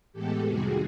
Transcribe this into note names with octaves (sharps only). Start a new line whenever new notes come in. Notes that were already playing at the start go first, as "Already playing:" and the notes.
A2 E3 G#3 B3 G4 A4
F2 C3 D#3 G3 F#4 G#4